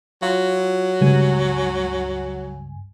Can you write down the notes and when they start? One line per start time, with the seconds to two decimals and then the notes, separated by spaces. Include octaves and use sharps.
0.22 F#3 F4
1.01 C#2 G2 G#5